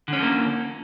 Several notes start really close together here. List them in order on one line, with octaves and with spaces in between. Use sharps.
D3 C#4 F3 A#3